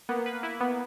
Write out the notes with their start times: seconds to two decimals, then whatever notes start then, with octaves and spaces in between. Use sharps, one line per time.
0.09 A#3 B3
0.26 B4
0.43 E4
0.61 B3